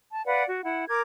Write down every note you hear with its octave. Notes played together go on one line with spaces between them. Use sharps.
A5
B4 D5 F5 F#5
F#4
E4 F#5
A#4 D6 G#6